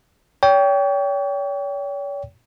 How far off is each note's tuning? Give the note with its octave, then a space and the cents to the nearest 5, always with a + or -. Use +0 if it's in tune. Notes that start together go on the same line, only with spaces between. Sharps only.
C#5 +40 G5 +0